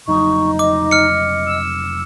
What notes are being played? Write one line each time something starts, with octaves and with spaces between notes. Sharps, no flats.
F1 F#3 D#4 C#6
D#5 D6
F6 C#7
E6